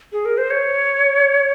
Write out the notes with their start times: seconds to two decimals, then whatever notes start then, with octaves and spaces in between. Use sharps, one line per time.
0.12 G#4
0.25 A#4
0.38 C5
0.51 C#5